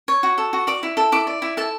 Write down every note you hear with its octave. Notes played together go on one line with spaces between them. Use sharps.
C#5
F#4
A4
F#4
D5 D6
E4
A4
E4 D6
D5
E4
A4 A5